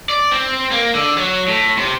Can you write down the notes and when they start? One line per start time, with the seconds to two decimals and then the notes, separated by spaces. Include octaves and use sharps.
0.09 D5
0.31 C4
0.71 A#3
0.95 D3
1.17 F#3
1.48 A2
1.78 C3